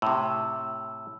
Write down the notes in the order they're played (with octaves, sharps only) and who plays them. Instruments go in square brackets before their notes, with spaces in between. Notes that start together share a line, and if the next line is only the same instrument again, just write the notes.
[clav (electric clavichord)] A2 C3 [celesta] E6